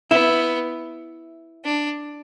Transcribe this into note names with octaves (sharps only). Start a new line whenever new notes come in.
B3 E4
D4